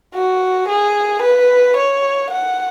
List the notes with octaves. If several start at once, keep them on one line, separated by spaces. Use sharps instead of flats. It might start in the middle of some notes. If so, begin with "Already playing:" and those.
F#4
G#4
B4
C#5
F#5